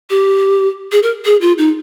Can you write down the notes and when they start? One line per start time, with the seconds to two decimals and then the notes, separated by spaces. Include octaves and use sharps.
0.10 G4
0.92 G#4
1.03 A#4
1.25 G#4
1.41 F4
1.58 D#4